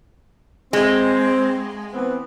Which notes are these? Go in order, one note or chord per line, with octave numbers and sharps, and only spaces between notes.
G#3 C4
E3 B3 C4